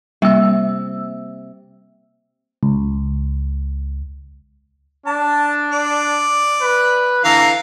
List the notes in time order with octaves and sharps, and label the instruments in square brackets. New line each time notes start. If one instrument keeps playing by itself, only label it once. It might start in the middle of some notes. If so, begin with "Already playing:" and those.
[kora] C3 [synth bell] G3 A#3 E6
[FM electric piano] C#2
[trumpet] D4 [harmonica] A5
[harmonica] D5
[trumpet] B4
[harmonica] D3 E3 F5 [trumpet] A#5